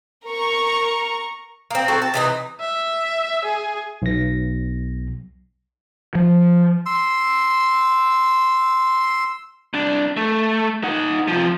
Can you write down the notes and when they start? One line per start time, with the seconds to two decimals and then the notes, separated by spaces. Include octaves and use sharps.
0.25 A#4 A#5 C#6
1.71 A#3 C4
1.88 C4 F#4 A4
2.02 A5
2.14 C3 E3 D#4
2.60 E5
3.45 G#4
4.02 B1 A#6
6.15 F3
6.86 C6 E6
9.74 C2 D4
10.17 A3
10.83 D#4 F#5
11.28 C3 F3